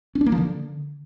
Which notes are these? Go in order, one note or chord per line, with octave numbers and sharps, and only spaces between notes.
C#4
D4
A#3
F3
D3